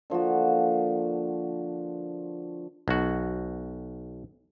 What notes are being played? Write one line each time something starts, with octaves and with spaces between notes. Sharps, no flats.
D3 F3 A#3 F#4
B1 F#4